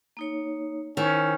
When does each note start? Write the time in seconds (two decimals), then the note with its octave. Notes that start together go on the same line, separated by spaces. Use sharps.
0.17 A#3 D#4 C#5
0.97 D#3 C#4 E4 C5